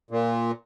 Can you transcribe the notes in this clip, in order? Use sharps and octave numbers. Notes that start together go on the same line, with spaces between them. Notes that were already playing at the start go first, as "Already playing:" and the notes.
A#2